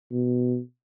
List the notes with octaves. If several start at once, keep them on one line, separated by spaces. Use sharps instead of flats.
B2